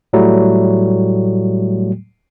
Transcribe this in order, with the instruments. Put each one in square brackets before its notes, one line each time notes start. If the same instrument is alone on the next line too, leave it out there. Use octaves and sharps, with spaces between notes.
[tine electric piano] A2 F#3 G3 A3